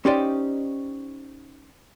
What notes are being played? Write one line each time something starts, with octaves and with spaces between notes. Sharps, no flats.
C#4 D#4 G4 C5 D5 D#5